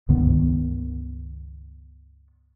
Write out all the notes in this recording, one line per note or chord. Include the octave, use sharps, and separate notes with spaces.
C#2 G2 D#3 B3